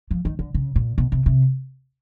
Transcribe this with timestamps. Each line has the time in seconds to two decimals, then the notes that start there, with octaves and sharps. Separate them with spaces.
0.11 F3
0.25 D#3
0.39 D3
0.54 C#3
0.76 A#2
0.98 B2
1.12 C3
1.26 C3